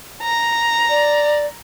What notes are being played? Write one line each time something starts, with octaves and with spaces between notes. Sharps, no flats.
A#5
D5